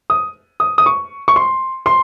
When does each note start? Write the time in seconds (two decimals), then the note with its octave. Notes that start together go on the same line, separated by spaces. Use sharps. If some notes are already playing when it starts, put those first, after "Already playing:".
0.10 D#6
0.60 D#6
0.78 D#6
0.86 C#6
1.28 C#6
1.36 C6
1.86 C6